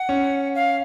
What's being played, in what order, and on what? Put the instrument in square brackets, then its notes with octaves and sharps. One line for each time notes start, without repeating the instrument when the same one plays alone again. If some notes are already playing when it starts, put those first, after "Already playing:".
Already playing: [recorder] F#5
[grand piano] C#4
[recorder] F5